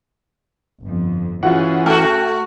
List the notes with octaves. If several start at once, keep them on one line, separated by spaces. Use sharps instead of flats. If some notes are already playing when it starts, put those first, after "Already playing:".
G1 F2
E3 C#4 F4 F#4 G#4 F#5
A3 F#4 A4 G5